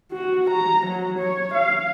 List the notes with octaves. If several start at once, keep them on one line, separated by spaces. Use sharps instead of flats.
F#4
A#5
F#3
C#5
F5